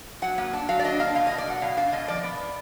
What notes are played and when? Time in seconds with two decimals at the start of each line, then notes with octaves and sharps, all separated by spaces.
0.22 F#3 F#5
0.38 A#3
0.53 D4
0.69 F#3 F5
0.79 D5
0.84 D4 D#5
1.00 A#3 F5
1.15 B2 F5
1.27 B2 D#5
1.38 D5
1.46 F#3 F#5
1.61 B2 F5
1.77 D4 F5
1.92 B2 D#5
2.08 F3 D5
2.23 B3